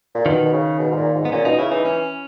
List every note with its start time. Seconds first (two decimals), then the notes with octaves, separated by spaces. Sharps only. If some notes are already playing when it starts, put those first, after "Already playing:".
0.15 A#2
0.26 B2 D#3
0.45 B2
0.53 C#3
0.79 B2
0.91 G#2
0.96 A#2
1.14 G#2
1.25 B3
1.32 A#2 C#4
1.45 B2 D#4
1.58 C#3 E4
1.71 E3 D#4
1.85 E3 C#4